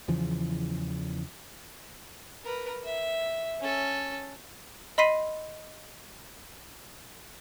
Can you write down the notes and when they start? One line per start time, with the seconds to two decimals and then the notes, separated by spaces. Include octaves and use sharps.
0.08 E2 C#3 E3 F3
2.44 A#4 B4
2.84 E5
3.60 C#4 A4
4.98 D#5 B5 C6 B6 C7 D#7